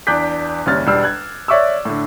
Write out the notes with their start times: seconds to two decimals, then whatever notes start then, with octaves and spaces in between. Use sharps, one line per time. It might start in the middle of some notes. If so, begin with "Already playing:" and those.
0.07 E2 D4 D6 F#6 G6 B6
0.66 F#1 D#2 G3 C#4 F6 A6
0.87 E1 G3 D4 E6 F6 C7
1.03 F#6 G#6
1.48 C#5 D5 E5 C#6 D6 E6
1.85 A2 D3